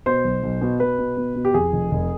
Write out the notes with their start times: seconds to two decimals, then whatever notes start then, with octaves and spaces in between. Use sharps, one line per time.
0.06 B2 C5
0.24 B1
0.43 B1
0.61 B2
0.80 B2 B4
0.99 B2
1.17 B2
1.36 B2
1.45 G4
1.54 F2 G#4
1.72 F1
1.91 F1